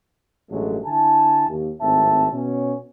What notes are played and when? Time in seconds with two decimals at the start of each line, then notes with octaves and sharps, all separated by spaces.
0.50 A1 G2 F#3 G#3 A3
0.86 D3 E4 G#5 A5
1.48 D#2
1.81 G#1 A2 C4 E5 A5
2.33 B2 C#4